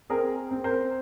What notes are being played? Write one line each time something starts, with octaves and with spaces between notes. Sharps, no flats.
C4 G#4 A#4
C4
A#4 C5